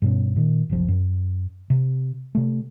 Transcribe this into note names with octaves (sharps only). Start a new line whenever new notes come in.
G2 B2 C#4
A#2 D#3
F#1 C2 F3
F#2
C3
C3 A3